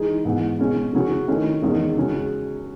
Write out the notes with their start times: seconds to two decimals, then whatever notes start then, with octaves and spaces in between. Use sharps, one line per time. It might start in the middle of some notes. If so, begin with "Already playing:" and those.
Already playing: E3 G#3 D#4 G#4
0.25 G#2 E3 B3
0.59 B2 G#3 C#4
0.93 C#3 F#3 C#4 F#4
1.28 D#3 A3 C#4 E4
1.62 E2 D#3 G#3 C#4 G#4
1.96 C#3 G#3 C#4 F#4